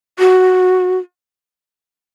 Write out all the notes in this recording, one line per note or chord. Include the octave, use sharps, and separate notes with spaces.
F#4